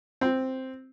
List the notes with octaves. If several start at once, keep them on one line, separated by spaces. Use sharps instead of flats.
C4